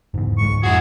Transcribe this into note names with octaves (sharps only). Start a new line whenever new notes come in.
F#1 E2 G#2
D1 C#2 G#3 C#6
F1 F2 E4 F#4 G#4